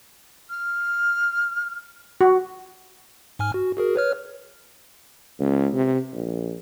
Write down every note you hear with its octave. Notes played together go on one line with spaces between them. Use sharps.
F6
F#4
G#2 G#5 F6
F#4
F#4 G#4 A#4
B4 C#5 F6
C#2
C3
A#1